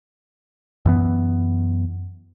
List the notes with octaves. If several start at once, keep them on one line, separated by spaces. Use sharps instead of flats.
F#2 E3 B3